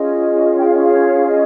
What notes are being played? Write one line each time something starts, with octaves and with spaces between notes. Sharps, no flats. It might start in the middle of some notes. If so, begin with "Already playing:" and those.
Already playing: C#4 F4 G#4 D#5
G5
F5
D#5
C#5 F5
D#5